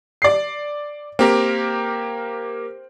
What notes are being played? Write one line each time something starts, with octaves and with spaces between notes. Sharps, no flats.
D5 C7
A#3 C4 G4 A#4